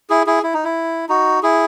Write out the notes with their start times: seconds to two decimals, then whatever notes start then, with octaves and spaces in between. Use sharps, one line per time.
0.10 E4 G#4
0.27 E4 G#4
0.43 E4
0.54 D#4
0.65 E4
1.09 D#4 F#4
1.43 E4 G#4